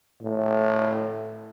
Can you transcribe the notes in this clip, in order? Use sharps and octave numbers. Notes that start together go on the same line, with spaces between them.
A2